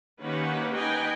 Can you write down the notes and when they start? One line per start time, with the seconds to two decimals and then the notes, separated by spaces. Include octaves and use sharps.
0.22 D#3 A#3 C#4 G4 B4 F#5
0.73 D#4 B4 D#5 G5 G#5